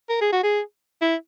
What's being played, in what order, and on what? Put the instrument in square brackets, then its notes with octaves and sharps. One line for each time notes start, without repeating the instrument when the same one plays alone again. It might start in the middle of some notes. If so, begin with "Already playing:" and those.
[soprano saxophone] A#4
G#4
F#4
G#4
E4